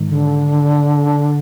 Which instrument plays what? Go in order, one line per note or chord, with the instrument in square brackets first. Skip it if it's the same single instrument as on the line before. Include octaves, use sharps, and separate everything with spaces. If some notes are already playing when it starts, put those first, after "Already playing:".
Already playing: [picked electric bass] G#2 D#3 G#3
[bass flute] D3